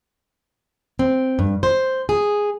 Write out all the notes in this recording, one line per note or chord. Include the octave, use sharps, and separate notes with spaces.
C4
G2
C5
G#4